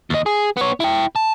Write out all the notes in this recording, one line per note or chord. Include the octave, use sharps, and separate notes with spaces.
D#2 D#5
G#4
B3 C#5
E4 G5
A5